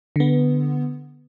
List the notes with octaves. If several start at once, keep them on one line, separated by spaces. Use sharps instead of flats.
D3 B3